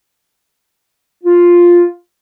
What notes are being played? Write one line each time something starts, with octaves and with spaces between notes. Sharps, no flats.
F4